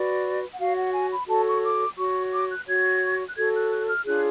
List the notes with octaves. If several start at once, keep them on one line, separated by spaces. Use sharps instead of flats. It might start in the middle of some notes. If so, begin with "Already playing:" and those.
Already playing: F#4 B4 D5
F#5
F#4 C#5 F5
F#5
G#5
B5
F#4 A4 C#5 A5
C#6
D6
F#4 C#5 C#6
D6
F#6
F#4 C#5 G#6
F#6
F#4 A4 C#5 G#6
F#6
F#6
F6
D4 F4 G#4 C#5 F#6